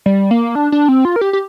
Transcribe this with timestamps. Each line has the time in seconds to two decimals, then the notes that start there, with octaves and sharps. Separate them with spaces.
0.06 G3
0.31 A#3
0.55 D4
0.72 D4
0.88 C4
1.05 F4
1.16 A#4
1.21 G4
1.33 G4